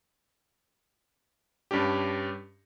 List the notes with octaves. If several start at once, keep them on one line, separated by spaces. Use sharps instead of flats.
G2 C#4 D4 G4